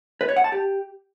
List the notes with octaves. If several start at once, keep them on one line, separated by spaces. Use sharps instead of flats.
B4
C#5
F#5
A5
G4